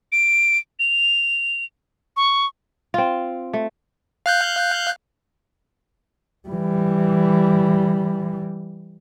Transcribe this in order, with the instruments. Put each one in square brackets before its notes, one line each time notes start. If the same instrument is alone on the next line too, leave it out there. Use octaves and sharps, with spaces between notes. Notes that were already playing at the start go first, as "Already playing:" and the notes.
[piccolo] D7
F7
C#6
[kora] C4 F4
A3
[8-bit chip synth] F5 F#6 G6
[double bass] E3 G3